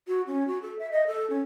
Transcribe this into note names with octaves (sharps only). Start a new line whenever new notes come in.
F#4
C#4
F#4
A4
E5
D#5
A4
C#4